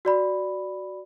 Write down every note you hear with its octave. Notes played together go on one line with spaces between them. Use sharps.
F#4 D5 B5